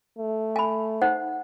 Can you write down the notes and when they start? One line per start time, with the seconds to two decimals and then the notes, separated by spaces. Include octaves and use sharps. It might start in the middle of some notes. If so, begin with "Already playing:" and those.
0.19 A3
0.56 G#5 B5
1.02 D#4 C5 F#5